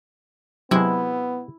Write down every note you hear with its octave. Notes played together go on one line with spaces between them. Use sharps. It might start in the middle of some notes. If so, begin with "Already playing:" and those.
C3 F#3 G#3 B3 E4